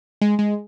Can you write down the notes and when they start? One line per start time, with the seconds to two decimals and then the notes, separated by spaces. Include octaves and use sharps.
0.21 G#3
0.39 G#3